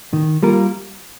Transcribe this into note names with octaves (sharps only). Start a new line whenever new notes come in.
D#3
G3 A#3 F4 A#4